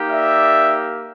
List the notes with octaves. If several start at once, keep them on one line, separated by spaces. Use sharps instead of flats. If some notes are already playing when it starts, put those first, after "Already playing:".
Already playing: A#3 D#4 G4
D5 E5